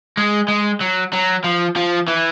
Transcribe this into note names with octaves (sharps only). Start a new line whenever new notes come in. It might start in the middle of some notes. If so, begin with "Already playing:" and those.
G#3
G#3
F#3
F#3
F3
F3
E3